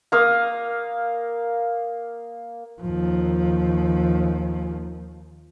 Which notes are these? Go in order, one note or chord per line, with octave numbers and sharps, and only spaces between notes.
A#3 F5 D#6
D#2 F3